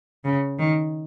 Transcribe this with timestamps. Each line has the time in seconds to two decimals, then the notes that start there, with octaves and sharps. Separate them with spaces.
0.25 C#3
0.59 D#3